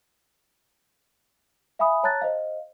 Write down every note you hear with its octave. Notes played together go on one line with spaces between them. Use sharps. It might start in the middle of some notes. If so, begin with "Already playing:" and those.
E5 F5 G#5 B5 D#6
C#5 A5 A#5 F#6 A6
C5 D#5 F5